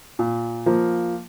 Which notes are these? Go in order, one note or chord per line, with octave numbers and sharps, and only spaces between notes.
A#2
F3 A#3